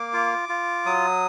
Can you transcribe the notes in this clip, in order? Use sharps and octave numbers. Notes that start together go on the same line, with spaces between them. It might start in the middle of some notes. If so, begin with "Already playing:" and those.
Already playing: A#3 D6
F4
F4
F#3 D#6